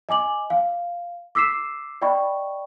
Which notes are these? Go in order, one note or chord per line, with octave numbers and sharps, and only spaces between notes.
D#5 G#5 D6 F#7
F5
D6 E6 B6 C7 E7
D5 D#5 G5 B5 C#6